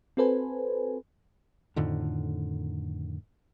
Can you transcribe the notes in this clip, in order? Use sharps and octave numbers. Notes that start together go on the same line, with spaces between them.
C4 F#4 A4 B4 C5 G#5
F2 A2 D3 D#3